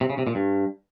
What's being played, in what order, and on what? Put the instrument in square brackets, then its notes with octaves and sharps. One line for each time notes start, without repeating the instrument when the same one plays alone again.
[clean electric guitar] C3
C#3
C3
A#2
G2